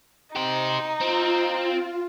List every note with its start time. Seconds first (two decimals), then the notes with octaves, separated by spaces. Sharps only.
0.35 D#4 G4 C5
1.01 C4 F4